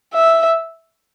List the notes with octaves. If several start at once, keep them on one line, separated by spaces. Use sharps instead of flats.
E5